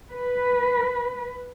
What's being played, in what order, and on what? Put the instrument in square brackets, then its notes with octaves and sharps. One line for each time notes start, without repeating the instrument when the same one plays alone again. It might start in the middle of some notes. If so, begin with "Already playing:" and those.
[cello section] B4